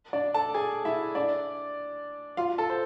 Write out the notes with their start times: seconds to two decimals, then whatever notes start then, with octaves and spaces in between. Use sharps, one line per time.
0.13 D4 D5
0.34 A4 A5
0.55 G#4 G#5
0.85 E4 E5
1.15 D4 D5
2.37 F4 F5
2.58 A4 A5
2.70 C5